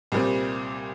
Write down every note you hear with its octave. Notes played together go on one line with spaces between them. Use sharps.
C2 A#2 G3 C4